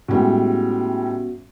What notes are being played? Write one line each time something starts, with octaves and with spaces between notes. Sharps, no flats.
A2 G3 G#3 B3 C#4 F#4